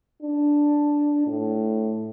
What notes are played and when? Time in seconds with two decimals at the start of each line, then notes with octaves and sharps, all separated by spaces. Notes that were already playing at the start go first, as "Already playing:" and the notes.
0.22 D4
1.27 A2